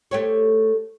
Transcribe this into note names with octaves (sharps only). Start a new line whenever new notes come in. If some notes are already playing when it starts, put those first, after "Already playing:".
A3 G4 C#5